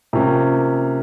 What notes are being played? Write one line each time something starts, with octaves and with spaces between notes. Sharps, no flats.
C3 F3 A#3 C#4